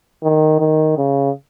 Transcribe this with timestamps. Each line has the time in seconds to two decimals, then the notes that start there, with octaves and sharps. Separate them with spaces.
0.23 D#3
0.60 D#3
0.98 C#3